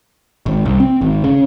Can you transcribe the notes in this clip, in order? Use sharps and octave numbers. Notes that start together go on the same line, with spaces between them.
G#1
C2
C4
G#1
C#3